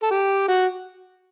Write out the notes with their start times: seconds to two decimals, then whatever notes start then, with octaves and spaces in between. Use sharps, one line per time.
0.03 A4
0.11 G4
0.48 F#4